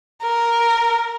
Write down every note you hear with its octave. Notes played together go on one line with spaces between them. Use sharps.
A#4